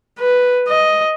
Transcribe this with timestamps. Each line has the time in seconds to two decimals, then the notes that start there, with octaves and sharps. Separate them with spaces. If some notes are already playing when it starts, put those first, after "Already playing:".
0.19 B4
0.68 D#5